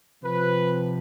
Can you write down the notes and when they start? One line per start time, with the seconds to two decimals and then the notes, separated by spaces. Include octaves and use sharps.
0.23 C3 F3 B4